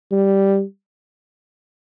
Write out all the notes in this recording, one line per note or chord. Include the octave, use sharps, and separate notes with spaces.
G3